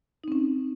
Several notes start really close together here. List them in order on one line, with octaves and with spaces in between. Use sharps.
D#4 C4 C#4